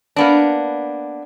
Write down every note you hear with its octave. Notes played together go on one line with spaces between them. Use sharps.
A#3 B3 D4